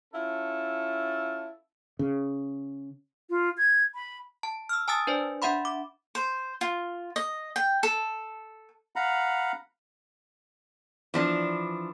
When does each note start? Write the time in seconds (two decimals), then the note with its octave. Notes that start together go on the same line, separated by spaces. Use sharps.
0.13 C#4 E4 F4 A4
1.99 C#3
3.30 F4
3.58 G#6
3.95 B5
4.43 A5
4.69 E6 F6
4.88 G#5 A5 D#6 E6 A6
5.07 D4 B4 C5 D5 G#5
5.42 D4 E5 F#5 B5 C6
5.65 D6
6.15 C5
6.61 F4
7.16 D#5
7.56 G5
7.83 A4
8.96 F5 F#5 A#5 B5
11.14 E3 F3 D4